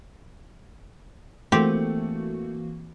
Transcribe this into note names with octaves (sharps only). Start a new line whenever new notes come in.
E3 A3 A#3 C4 F#4 G4